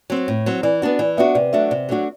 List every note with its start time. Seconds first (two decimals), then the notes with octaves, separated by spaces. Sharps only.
0.10 F#3 C4
0.28 A2
0.46 F#3 C4
0.63 E3 D5
0.82 B3 D4 F#4
0.99 E3 D5
1.17 B3 D4 F#4 E5
1.35 C3 D5
1.53 F#3 A3 D4 F#4 E5
1.71 C3 D5
1.89 F#3 A3 D4 F#4